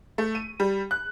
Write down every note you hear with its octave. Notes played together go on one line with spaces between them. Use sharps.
A3
D#7
G3
F#6